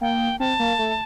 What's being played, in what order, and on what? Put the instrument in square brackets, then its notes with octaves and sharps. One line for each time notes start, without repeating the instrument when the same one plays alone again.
[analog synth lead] A#3 [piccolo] G5
[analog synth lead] C4 [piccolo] A5
[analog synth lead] A#3
A3